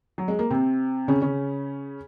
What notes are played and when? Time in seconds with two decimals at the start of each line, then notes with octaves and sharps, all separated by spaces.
0.18 F#3
0.28 G#3
0.39 A#3
0.50 C3 C4
1.08 C#3 C#4
1.22 C#3 C#4